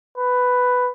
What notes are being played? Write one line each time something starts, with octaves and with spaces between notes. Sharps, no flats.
B4